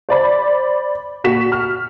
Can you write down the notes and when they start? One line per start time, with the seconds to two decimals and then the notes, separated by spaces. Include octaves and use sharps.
0.09 C5 D5 B5
1.24 A#2 F#4 B6 E7
1.52 F6